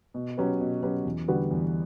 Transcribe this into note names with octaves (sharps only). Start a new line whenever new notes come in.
B2
F#3 C#4 G4 B4
B2
F#3 C#4 G4 B4
E2
D3 G3 B3 F#4
E2